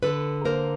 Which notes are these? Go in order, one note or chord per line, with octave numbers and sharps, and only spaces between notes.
D3 A4 B4
A#3 A#4 C5